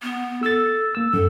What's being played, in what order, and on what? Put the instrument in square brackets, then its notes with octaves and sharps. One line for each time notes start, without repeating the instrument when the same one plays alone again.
[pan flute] B3
[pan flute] A4 [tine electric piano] E6 A6
[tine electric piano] A#3 E6
[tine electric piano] F#2 [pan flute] A4